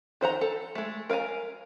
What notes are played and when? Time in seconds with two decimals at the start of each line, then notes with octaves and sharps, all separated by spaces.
0.21 D#3 C5 F#5 A#5
0.41 A4
0.75 G#3 A3
1.10 A#4 F5 G5 G#5 A#5